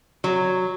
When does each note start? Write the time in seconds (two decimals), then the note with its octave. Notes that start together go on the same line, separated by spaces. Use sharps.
0.24 F#3